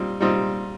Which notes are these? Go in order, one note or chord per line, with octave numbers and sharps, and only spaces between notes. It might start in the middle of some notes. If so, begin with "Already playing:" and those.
Already playing: A#2 G3 C4 D#4
A#2 G3 C4 D#4